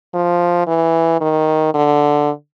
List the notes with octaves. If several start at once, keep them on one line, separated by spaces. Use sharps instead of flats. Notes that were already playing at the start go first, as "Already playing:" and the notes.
F3
E3
D#3
D3